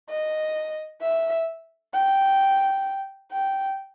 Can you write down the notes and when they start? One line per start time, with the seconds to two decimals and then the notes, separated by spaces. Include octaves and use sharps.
0.10 D#5
1.01 E5
1.94 G5
3.32 G5